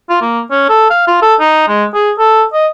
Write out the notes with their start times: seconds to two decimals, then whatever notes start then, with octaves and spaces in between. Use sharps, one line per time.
0.10 F4
0.21 A#3
0.51 C#4
0.69 A4
0.90 F5
1.07 F4
1.22 A4
1.40 D#4
1.68 G#3
1.94 G#4
2.18 A4
2.53 D#5